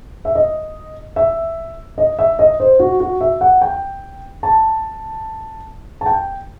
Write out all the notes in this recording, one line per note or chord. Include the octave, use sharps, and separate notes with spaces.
E5
D#5
E5
D#5
E5
D#5
C5
F#4
F#4
E5
F#5
G5
A5
A5
G5